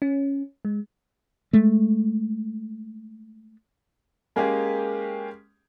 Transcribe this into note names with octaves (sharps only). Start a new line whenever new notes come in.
C#4
G#3
G#3 A3
G#3 A#3 C#4 G4 G#4